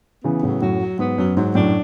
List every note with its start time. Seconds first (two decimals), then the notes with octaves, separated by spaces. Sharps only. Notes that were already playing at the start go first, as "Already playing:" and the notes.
0.24 C#3 E3 B3
0.43 A2 C#3 F#3
0.62 F#2 A2 F#4
0.80 F#3
0.99 G#2 B3
1.18 F#2 F#3
1.37 G#2 F#3
1.55 F#2 A2 D4